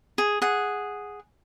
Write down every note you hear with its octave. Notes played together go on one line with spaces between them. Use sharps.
G#4
G#4 F#5